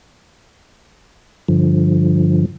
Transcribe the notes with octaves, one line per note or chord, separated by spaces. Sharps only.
G2 D3 F3